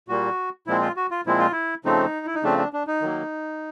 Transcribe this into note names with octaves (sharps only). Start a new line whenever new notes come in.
A#2 G3 A#3 F#4
A#2 F3 G#3 C4 E4
F4
F#4
F4
A#2 F3 G#3 C4 E4
F4
E4
C#3 F3 A3 C4 D#4
E4
D#4
C#3 F3 A3 C4 D4
D4
D4
D#4
D#3 F#3 A#3